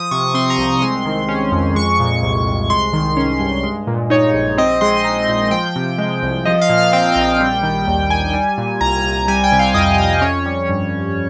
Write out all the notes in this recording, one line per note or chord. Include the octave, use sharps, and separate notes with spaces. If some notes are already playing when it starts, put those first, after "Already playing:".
Already playing: F3 D#6
C3 C#6
C4 C6
A#5
C2
A#5
G#3 C6
D#3
C#4
F2
G#3 C#6
A#2
C2
C2
G#3 C6
D#3
C#4
G2
G#3
A#2
D#4 C#5
A#1
C4 D#5
G#3 C6
D#4
A#2
F3 G5
C3
G#3
C2
F3 D#5
F5
A#2
F5
C4 G5
A#1
G3
D#3
D#2
D#2 G#5
G3
A#2
C2 A#5
C2
G3 G#5
G5
C3
F5
F2 D#5
F2 D#5
C#4 C#5
G3
G2